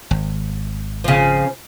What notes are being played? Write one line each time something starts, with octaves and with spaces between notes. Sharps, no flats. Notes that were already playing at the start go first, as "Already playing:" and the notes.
G#1
C#3 F3